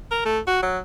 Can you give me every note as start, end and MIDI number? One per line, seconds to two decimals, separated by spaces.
0.11 0.21 70
0.25 0.39 57
0.47 0.62 66
0.63 0.79 54